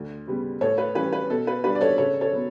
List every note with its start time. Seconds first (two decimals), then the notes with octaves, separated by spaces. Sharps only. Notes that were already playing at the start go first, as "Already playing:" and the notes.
Already playing: D2
0.27 C#3 G3 B3
0.61 A2 A4 C#5
0.78 B4
0.95 E3 G3 C#4 B4
1.13 B4
1.29 B2 A4
1.47 B4
1.64 G3 D4 B4
1.75 D5
1.81 A4 C#5
1.98 C#3 A4 C#5
2.21 A4 C#5
2.32 F#3 B3